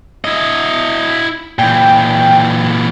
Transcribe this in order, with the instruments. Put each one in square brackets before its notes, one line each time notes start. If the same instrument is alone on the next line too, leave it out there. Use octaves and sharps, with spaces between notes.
[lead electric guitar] E4 D#5
[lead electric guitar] A#2 E3 [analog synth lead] G5